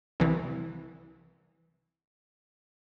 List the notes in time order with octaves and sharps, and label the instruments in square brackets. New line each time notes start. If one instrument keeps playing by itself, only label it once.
[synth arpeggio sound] C2 E3